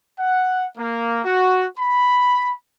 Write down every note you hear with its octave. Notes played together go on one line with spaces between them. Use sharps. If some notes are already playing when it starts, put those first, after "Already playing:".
F#5
A#3
F#4
B5